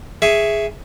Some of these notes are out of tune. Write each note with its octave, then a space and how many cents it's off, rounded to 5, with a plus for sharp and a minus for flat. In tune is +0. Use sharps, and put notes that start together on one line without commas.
G#4 +0 E5 +0 C#6 +15